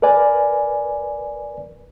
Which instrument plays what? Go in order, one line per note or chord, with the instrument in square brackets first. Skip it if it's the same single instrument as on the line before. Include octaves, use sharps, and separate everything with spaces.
[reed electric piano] A#4 B4 D5 G#5